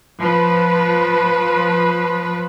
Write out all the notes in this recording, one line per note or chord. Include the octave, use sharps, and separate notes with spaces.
F3 B4